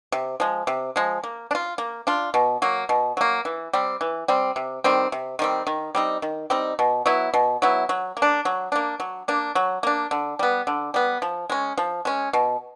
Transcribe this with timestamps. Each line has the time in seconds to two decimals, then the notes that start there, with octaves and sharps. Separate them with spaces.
0.12 C3
0.40 F3 G#3
0.67 C3
0.96 F3 G#3
1.23 A#3
1.51 D4
1.55 F4
1.78 A#3
2.07 D4 F4
2.34 B2
2.62 F#3 A#3
2.89 B2
3.17 F#3 A#3
3.45 E3
3.73 G3 C4
4.01 E3
4.28 G3 C4
4.56 C3
4.84 D#3 G3 C4
5.12 C3
5.39 D#3 G3 C4
5.67 D#3
5.95 G3 C4 D#4
6.22 D#3
6.50 G3 C4 D#4
6.79 B2
7.06 F#3 B3 E4
7.34 B2
7.62 F#3 B3 E4
7.89 F#3
8.17 A#3
8.22 D4
8.45 F#3
8.72 A#3 D4
9.00 F#3
9.28 A#3 D4
9.55 F#3
9.83 A#3 D4
10.11 D3
10.39 G3 B3
10.67 D3
10.94 G3 B3
11.22 F3
11.50 G#3 C#4
11.78 F3
12.05 G#3 C#4
12.33 B2